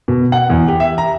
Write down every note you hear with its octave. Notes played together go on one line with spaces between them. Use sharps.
B2
F#5
E2
G4
E5
A#5